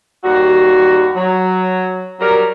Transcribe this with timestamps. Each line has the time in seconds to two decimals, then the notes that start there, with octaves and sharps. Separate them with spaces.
0.24 D#2 G3 F#4
1.14 F#3
2.20 F#3 G3 A#4